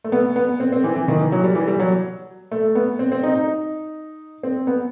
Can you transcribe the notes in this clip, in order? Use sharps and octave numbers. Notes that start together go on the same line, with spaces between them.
A3
B3
B3
C4
C4
E3
E3
D#3
E3
F#3
G3
E3
G3
F#3
A3
B3
C4
C4
D#4
D#4
C4
B3